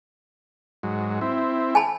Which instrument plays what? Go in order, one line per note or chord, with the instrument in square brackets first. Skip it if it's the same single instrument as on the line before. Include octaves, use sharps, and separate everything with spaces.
[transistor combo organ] G#2 F#3
C4 E4
[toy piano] G#5 A5 B5